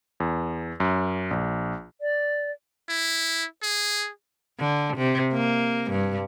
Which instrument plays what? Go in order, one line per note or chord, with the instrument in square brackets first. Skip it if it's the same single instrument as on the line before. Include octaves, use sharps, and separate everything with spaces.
[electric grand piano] E2
F#2
A#1
[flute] D5
[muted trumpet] E4
G#4
[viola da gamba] D3
C3
A#3
G2